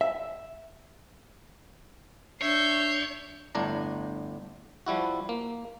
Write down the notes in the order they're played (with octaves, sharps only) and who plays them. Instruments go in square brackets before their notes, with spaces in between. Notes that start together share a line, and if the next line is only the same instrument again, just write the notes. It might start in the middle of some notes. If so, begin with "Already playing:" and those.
[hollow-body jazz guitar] E5
[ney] D4 [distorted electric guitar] C#5 [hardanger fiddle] E5 [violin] G6 C7
[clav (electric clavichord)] G1 A2 D4 A#5
F3 G3 E4 F#4
A#3